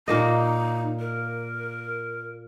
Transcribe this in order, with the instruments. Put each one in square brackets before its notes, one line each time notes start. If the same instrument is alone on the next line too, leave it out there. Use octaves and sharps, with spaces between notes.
[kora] A#2 A#3 D#5 [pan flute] D#4
[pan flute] A#4